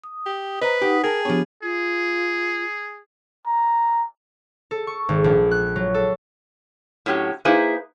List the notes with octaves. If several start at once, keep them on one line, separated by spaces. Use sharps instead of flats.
D#6
G4
B4 C5 D#5 A#5
D#4 G4 F#5 D#6
G#4 A#4 G5 A5
F3 B3 D4 G4 C#5
F4 G#4
A#5
A4
C#6
G#1
A#1
F#6
F#3
A4
A2 F#3 C#4 G4
A#3 D#4 E4 G#4 B4 C5